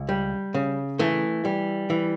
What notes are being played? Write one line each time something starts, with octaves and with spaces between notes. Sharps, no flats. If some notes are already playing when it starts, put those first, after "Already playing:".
Already playing: C#2
G3
C#3
E3 A3
G3
E3